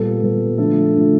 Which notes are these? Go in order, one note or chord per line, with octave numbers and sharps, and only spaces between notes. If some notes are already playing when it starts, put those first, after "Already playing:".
Already playing: A#2 G3 B3 A4
A#2 G3 B3
D3 F3 A3 A4
D3 F3 A3